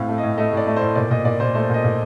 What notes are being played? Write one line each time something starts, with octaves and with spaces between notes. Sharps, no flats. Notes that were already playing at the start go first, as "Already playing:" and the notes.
Already playing: A2 C4 F5
A3
A2 D#5
A3 D#5
A2 D5
A3
A2 C5
A#2 D5
A#2 D#5
A#2 D5
A#2 C5
A3 C5
A#2 D#5
A#2